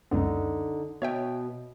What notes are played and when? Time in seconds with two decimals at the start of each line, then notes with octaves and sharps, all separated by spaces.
0.11 C#2 F#2 D3 B3 D#4
1.02 B2 C#5 E5 G5